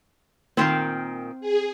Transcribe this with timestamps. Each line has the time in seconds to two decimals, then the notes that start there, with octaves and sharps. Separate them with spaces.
0.57 A#2 D#3 C4 C5 F5
1.41 G#4